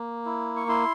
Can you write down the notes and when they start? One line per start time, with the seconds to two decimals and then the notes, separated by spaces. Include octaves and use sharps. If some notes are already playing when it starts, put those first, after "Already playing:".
Already playing: A#3
0.26 E4
0.56 C#6
0.68 E4 C6